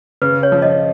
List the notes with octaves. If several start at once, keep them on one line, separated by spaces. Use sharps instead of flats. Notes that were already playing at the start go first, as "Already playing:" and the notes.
C#3 B4
C#5
F3
D#5